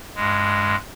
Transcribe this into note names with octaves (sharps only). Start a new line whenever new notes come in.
G2 G#3